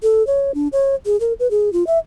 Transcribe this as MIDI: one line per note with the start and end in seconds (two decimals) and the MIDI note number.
0.03 0.25 69
0.27 0.52 73
0.55 0.68 62
0.73 0.95 73
1.06 1.19 68
1.20 1.33 70
1.40 1.50 71
1.51 1.72 68
1.73 1.86 65
1.87 1.98 76